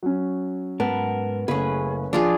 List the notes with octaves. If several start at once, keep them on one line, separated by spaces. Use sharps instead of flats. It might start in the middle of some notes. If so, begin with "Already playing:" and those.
F#3 C#4
G#2 B3 A#4 A5
F#1 A3 C#4 G#4 B4
F3 D4 F4 G#4